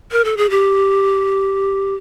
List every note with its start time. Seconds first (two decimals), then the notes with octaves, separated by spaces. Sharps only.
0.12 A#4
0.25 A4
0.37 G#4
0.50 G4